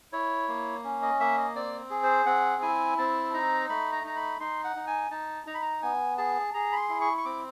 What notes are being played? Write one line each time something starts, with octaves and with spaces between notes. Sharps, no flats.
E4 C#5
A#3
C#4
D#5
A#3 E5
D#5
C4 D5
G#4
C5
C4 F#5
E4 G#5
C4 A5
D#4 A#5
A3 B5
A#5
D#4 A#5
B5
D#4 C6
F#5
D#4
G#5
D#4 A5
D#4 A#5
B5
A#5
B3 G#5
G#4 A5
G#4 A#5
B5
C6
E4
C#6
C#6
C4 D6